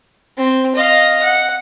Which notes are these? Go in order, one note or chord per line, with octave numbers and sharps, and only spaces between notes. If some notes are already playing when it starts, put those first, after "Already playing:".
C4
D#5 F5
F#5